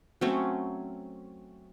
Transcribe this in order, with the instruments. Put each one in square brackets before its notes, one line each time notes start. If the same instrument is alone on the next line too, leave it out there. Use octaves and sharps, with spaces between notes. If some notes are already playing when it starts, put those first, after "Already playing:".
[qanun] F#3 A3 C4 C#4